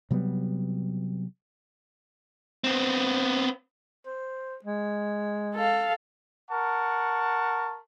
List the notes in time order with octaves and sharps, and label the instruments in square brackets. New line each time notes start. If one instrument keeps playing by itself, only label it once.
[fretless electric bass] C3 F#3 G3 B3
[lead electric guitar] B3 C4
[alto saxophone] C5
G#3
[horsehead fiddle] A4 F5
[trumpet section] A#4 F#5 A5 C#6